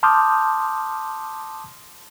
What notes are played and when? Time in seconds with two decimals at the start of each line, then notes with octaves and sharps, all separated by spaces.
0.03 A5 C6 D6 D#6 F6 G6